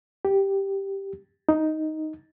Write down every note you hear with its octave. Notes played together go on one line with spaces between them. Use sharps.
G4
D#4